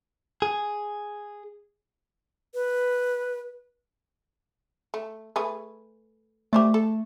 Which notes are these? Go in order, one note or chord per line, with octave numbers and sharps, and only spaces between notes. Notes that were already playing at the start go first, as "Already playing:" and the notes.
G#4
B4
A3
A3 G#4 B4
A3 G4 C5 D5
A4